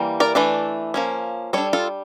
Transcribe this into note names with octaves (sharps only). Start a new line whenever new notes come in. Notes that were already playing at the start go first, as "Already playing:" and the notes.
Already playing: E3 G3 A#3
A#4 D5
E3 A3 D4
F3 A#3 C#4
G3 D4 A4 C#5
F4 A4